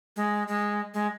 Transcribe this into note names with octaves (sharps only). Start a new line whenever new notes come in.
G#3
G#3
G#3